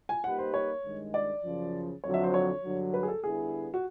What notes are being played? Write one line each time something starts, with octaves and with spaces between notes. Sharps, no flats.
G#5
G3 A#3 D#4 G4 B4 F#5
C5
C#5
G2 D#3 G#3
D5
F#2 C#3 F3
F2 D3 F#3 C#5
E5
C5
C#5
G2 D3 F#3
B4
G#4
A4
D3 G3 B3 E4 G#4
F#4